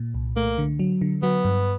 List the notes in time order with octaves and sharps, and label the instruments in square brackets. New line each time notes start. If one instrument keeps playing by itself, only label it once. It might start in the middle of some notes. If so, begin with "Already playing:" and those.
Already playing: [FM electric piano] A#2
C2
[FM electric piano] A3 [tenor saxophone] A#3
[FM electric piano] D3
F#3
D3
[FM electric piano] F#3 [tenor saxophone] B3
[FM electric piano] G2